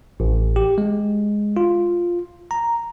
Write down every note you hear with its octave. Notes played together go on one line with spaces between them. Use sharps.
A1
G4
G#3
F4
A#5